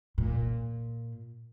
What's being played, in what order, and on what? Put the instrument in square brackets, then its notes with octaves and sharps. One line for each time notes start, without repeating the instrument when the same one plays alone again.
[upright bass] A#2